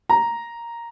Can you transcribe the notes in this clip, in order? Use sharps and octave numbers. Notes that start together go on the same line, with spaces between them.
A#5